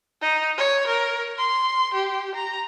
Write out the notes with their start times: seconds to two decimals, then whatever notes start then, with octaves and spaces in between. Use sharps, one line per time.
0.22 D#4
0.58 C#5
0.88 A#4
1.38 C6
1.94 G4
2.35 A#5